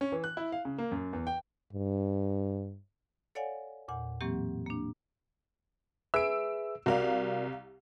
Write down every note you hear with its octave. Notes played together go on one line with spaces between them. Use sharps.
C#4
E3
F#6
E4
F5
C#3
A#3
F#2
E2
G5
G2
A4 C#5 D5 F5 F#5 G#5
E2 A#2 F#5
A2 E3 F#3 A#3 C4 G4
A#3 D4
G#4 B4 E5 E6 D7
C2 F#4 A#4 D5 F5